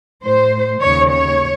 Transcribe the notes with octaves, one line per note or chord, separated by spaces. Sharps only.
A2 C5
D#2 C#3 C#5
C#5